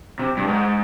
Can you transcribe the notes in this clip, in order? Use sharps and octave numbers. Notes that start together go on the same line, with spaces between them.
C3
G2
G#2